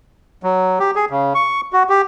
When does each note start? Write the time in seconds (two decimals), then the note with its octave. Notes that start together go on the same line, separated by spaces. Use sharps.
0.43 F#3
0.80 G4
0.96 G#4
1.10 C#3
1.35 C#6
1.73 F#4
1.89 G4